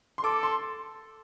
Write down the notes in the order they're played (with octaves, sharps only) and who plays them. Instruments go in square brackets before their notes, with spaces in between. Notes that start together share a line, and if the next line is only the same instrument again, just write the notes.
[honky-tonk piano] C6
[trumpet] A4 [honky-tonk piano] D6
[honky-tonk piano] C6